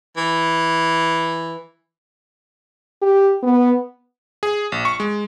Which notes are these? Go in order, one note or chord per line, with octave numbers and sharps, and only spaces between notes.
E3
G4
B3
G#4
A#1
C#6
G#3